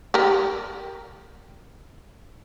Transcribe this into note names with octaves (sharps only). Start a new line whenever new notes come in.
G4 A#4